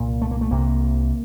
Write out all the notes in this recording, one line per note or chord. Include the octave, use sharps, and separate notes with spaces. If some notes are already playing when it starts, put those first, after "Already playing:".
Already playing: C2 A#2
A3
A#3
A3
C2 C3 A#3